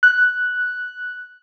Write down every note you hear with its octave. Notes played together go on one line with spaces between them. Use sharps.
F#6